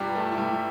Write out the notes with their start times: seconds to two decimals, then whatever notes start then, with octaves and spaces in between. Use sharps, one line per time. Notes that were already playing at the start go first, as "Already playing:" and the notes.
Already playing: G1 G2 G3 G4
0.15 A3 A4
0.32 E4
0.38 G3 G4